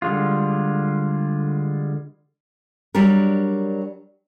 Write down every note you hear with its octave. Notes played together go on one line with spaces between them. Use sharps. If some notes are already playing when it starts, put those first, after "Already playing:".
D3 G3 G#3 F4
F#3 G3 D4 A#4